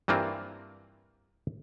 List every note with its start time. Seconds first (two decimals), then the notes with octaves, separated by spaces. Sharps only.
0.08 G2 E3 A#3 C4 F4